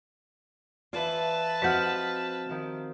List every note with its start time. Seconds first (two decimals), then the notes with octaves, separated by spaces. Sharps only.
0.93 E3 F4 B4 D5 A5
1.62 F3 C4 F#4 D#5 F#5 F6 G6 B6
2.49 D#3 F3